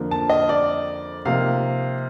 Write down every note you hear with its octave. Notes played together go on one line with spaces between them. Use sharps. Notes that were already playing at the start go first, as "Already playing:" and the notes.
Already playing: F2 D3 F3 A#3
A5
D#5
D5
C3 F3 A#3 D#4 F5